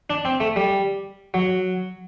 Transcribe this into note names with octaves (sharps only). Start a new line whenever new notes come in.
D4
C4
A3
G3
F#3